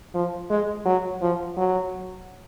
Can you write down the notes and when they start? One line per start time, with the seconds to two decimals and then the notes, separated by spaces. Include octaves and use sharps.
0.14 F3
0.50 G#3
0.86 F#3
1.22 F3
1.57 F#3